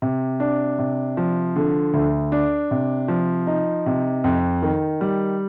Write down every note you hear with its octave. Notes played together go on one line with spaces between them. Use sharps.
C3
D4
C3
F3
D3
D2
D4
C3
F3
D#4
C3
F2
D#3
G3